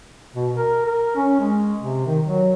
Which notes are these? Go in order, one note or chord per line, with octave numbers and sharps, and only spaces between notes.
B2
A#4
A#4
C#4
G#3
C3
D#3
F#3